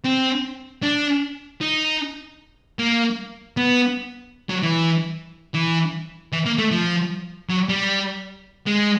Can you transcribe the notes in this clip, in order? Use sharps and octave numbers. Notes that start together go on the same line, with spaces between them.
C4
D4
D#4
A#3
B3
F#3
E3
E3
E3
A#3
A3
F3
F#3
G3
G#3